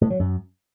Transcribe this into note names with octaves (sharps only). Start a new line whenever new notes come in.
A2
F#3
F#2